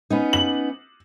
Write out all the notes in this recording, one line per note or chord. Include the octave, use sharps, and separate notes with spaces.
B3 C#4 D#4
F#7